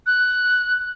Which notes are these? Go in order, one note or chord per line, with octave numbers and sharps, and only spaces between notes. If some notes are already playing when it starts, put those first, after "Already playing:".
F#6